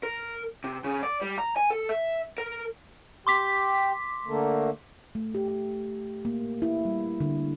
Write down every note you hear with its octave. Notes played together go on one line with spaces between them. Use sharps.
A#4
C3
C#3
D5
G3
A#5
G#5
A4
E5
A#4
G4 C6 D6 B6
D3 A3 A#3
A3
G4
G4
A#3
E4
G3
D3